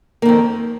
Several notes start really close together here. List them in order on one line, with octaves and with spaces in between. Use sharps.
A#3 D#3 F2